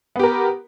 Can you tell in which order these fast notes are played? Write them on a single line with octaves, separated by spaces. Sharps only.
B3 G4 A#4